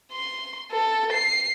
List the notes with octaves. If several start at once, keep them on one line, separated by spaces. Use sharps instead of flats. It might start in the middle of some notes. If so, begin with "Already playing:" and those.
C6
A4
C7